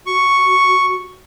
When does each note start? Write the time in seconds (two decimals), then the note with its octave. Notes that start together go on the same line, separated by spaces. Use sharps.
0.06 F#4 C#6